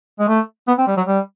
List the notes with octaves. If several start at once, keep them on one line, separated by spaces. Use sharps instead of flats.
G#3
A3
B3
C4
G3
F#3
G3